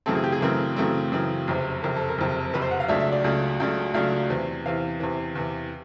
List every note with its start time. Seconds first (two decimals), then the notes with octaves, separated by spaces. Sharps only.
0.06 F#2 C#3 E3 A3 C4 A4
0.15 G#4
0.24 G4
0.32 G#4
0.41 F#2 C#3 E3 A3 C4 A#4
0.76 F#2 C#3 E3 A3 C4
1.12 F#2 C#3 E3 A3 C4
1.47 F#1 F2 C3
1.83 F#1 F2 C3 A#4
1.96 A4
2.09 A#4
2.18 F#1 F2 C3
2.53 F#1 F2 C3 B4
2.62 C5
2.71 F#5
2.80 F5
2.88 C#2 C#3 F#3 A3 D4 E5
3.00 E5
3.12 D5
3.24 C#2 C#3 F#3 A3 D4
3.60 C#2 C#3 F#3 A3 D4
3.94 C#2 C#3 F#3 A3 D4 F5
4.30 E2 C3 E3
4.66 E2 C3 E3 F5
5.00 E2 C3 E3
5.35 E2 C3 E3